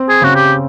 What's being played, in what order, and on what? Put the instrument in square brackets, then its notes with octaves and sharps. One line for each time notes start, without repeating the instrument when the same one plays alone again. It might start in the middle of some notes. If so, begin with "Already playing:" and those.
Already playing: [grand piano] C4
[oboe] G#4
[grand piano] C#3 [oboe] F#4
[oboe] G4